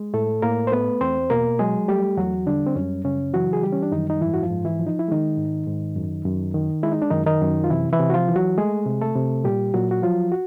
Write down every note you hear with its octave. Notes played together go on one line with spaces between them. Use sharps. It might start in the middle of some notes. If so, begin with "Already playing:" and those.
Already playing: G#3
A2 A3 A4
A2 A#3 A#4
C5
A3 B3 B4
E2 C4 C5
B2 A#3 A#4
F#3 G#3 G#4
G3 A3 G4
E2 F#3 F#4
D3 G3 D4
C4
F#2 C#4
C#3 C#4
E3 F#3 F#4
G#4
G3 G4
C#4
D4
F#2 D#3 D#4
D#4
G#2 E3 E4
F#4
F3 F4
G#2
E3 E4
F3
D#4
E4
D#3 G#3 D#4
G#2
G#2
F#2
F#2
D#3
G#3 E4
D#4
D4
F#2 D#3 D#4
D#3 D#4
F#2
F4
C3 E3 E4
E3 E4
C3
F#4
F3 F4
E3
F#3 F#4
G#3 A3 G#4
C3
A3 A4
C3
A#2 G3 G4
A#2 F#3 F#4
F#4
F3 F#3 F4
F#4